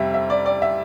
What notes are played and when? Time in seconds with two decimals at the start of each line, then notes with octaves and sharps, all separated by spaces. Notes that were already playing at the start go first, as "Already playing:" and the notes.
Already playing: F2 C3 G3 E5
0.14 E5
0.30 D5
0.46 D5
0.62 E5